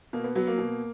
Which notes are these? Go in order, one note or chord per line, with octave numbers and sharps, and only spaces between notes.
B2 A#3
B3
F#3 B3
A#3
B2